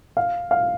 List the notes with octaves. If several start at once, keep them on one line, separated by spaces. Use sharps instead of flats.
F5
F5